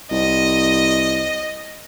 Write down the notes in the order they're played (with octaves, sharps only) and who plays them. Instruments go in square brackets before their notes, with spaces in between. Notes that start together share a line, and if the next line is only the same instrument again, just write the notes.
[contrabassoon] C2 [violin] D#5